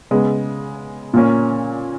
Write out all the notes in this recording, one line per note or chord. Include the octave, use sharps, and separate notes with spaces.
C#3 G#3 B3
A#2 A#3 C#4